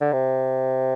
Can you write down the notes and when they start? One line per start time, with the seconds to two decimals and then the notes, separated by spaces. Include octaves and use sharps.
0.01 D3
0.13 C3